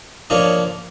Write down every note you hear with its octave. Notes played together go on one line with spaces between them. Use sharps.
F3 A#3 D4 F4 C#5 D#5